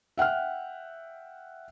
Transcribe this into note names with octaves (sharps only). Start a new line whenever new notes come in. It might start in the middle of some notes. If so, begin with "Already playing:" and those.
E5 F#5 G5 F6